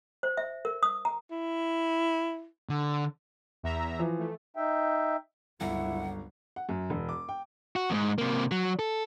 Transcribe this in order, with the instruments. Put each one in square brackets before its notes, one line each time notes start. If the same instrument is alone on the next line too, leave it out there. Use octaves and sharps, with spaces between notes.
[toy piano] C5
E5
A#4
D#6
A#5
[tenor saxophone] E4
[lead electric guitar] D3
[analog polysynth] E2 E5 A#5
[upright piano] E3 F3
[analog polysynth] A3
[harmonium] D#4 E5 G5
[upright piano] G1 [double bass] C#2 F#3 [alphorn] E4 [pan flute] F#5
[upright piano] F#5
F#2
E1
D6
G5
[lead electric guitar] F#4
E2 G#2
C3 A#3
F#3
A4